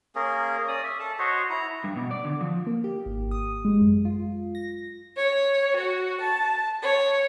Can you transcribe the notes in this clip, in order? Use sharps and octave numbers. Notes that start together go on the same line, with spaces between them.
A#3 C#4 G#4 A#4
C#4 D5 D#6
E5
A4 A5
F#4 C5 C#5 D#5
E4 A#5
G2
B2
D5
D3
F3
A#3
G4
G#1
D#6
G#3
F#2
F4
A#6
C#5
F#4
A5
C#5